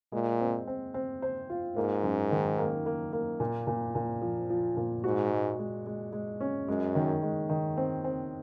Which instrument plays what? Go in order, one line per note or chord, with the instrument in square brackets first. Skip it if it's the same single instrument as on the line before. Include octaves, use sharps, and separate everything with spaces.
[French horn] A#2 [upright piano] G#3
[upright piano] C4
C4
C4
C5
F4
[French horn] G#2 [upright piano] A#3
[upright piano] F#2
D#3
A#3
A#3
A#3
A#2
A#2
A#2
F3
F3
A#2
[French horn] G#2 [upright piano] F#4
[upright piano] G#3
G#3
G#3
G#3
C#4
[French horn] F#2 [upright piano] G#3
[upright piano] D#3
G#3
D#3
C4
C4